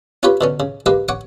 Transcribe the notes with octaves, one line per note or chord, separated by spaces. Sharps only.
C#4 F4 G4 B4 C#5 B5
B2 D3 C#4
C#3
G#3 A#3 G4 A#4 B4
C#5 F#5 C#6 D6